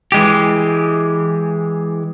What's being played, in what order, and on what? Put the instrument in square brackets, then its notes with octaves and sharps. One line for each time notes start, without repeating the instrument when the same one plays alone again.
[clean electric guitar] E3 G#3 G4